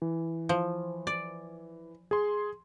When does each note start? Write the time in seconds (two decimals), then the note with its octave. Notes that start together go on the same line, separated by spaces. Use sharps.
0.02 E3
0.49 F3
1.07 D5
2.11 G#4 C6